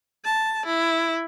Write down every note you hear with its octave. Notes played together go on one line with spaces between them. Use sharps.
A5
E4